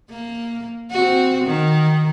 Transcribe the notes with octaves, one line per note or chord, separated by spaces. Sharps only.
A#3
C4 F#4
D#3